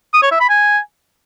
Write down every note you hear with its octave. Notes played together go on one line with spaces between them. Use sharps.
D#6
C#5
E5
B5
G#5